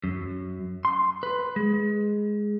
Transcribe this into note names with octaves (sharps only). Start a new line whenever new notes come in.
F#2
C6
B4
G#3